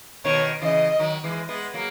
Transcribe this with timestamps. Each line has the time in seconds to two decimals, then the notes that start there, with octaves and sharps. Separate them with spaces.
0.25 B2 D#3 C#5
0.62 C#3 E3 D#5
0.99 D#3 F#3
1.24 E3 G#3
1.49 G#3 B3
1.74 F#3 A#3